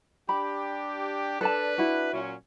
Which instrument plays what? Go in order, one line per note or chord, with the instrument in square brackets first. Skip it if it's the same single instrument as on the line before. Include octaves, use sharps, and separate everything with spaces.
[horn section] D4 G4 [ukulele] B5
[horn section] D4 B4 [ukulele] A4 D5 A5
[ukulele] E4 F#4
[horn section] A#2 F#3 C#4